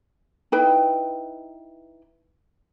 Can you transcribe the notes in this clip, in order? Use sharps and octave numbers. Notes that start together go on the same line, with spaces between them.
D#4 E4 B4 G5